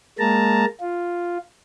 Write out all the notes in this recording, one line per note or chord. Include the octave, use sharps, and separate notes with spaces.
G#3 A#3 A5 A#5
F4